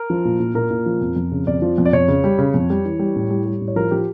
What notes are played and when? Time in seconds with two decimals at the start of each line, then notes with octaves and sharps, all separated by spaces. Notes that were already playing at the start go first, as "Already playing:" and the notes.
Already playing: A#4
0.10 F3
0.25 A#2
0.40 A#2
0.54 A#2 A#4
0.70 A#2
0.86 F3
1.01 F2
1.16 F2
1.32 C#3
1.47 F2 D5
1.62 F3
1.78 F2
1.85 D5
1.93 F2 C#5
2.08 C#3
2.24 G3
2.39 C#3
2.54 F2
2.70 G3
2.85 E3
2.99 G3
3.16 A2
3.30 G3
3.46 G3
3.61 A2
3.68 C#5
3.76 F3 A#4
3.91 F3 G4